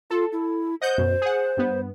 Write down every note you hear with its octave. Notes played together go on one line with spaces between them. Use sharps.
F4 A4
E4
C5 D#5 F#5 G6
F#2 B2
G#4 F#5
G2 B3